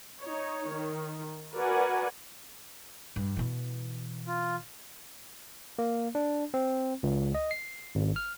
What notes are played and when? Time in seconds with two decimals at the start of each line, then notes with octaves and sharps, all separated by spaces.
0.21 D#4 C#5
0.73 D#3
1.55 F#4 A#4 B4 D5 F#5 G#5
3.16 G2
3.37 B2 E3
4.27 F4
5.79 A#3
6.15 D4
6.54 C4
7.03 C#2
7.35 D#5
7.51 C7
7.95 G#1
8.16 F6